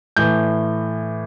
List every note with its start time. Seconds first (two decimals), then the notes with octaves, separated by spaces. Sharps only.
0.17 A2 E3 G6